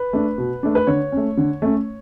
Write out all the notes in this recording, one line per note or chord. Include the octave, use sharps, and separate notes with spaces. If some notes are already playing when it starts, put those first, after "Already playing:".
Already playing: B4
A3 D4
B2
A3 D4
B4
D3 C#5
A3 C#4
D3
A3 C#4